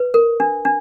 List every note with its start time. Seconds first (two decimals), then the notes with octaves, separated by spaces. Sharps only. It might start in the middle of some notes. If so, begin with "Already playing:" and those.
Already playing: B4
0.14 A#4
0.40 D4
0.65 D4